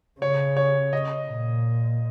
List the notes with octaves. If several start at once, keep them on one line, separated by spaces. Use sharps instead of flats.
C#3 C#5
C#5
D#5
A#2